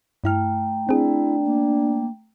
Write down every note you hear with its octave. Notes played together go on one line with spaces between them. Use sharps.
G2 A3 E4 G5 A#5 F6
C4 D4 E4 G#4
A#3